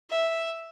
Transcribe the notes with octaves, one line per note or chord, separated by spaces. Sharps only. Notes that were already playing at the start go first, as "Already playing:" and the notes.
E5